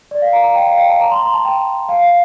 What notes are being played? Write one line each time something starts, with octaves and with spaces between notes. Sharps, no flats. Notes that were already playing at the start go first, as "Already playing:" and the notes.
D5
F5
A#5
A#5
G5
F5
G5
A5
A#5
C6
A#5
A5
G5
F5
F5